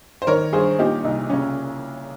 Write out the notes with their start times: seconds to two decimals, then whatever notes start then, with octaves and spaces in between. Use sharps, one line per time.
0.22 C5
0.27 D#3 A#4 C#5
0.53 G2 G#4 C5
0.79 A#2 D#4 G4
1.04 C2 D#4
1.30 C#3 C#4